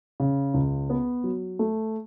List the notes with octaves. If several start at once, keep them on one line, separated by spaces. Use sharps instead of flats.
C#3
C#2
B3
F#3
A3